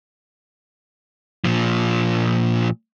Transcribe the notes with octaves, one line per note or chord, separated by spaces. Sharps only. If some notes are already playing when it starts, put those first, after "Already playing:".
A#2 F3